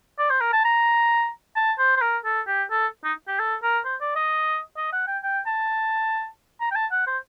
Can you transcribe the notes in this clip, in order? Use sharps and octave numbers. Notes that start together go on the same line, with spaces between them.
D5
C5
A#4
A5
A#5
A5
C5
C5
A#4
A4
G4
A4
D#4
G4
A4
A#4
C5
D5
D#5
D#5
F#5
G5
G5
A5
A#5
G5
A5
F#5
C5